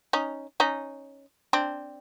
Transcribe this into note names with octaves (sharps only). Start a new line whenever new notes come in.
C#4 D#4
C#4 D#4
C4 D4